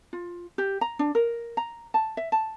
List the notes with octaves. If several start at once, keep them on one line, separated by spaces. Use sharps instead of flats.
F4
G4
A#5
D4
A#4
A#5
A5
E5
A5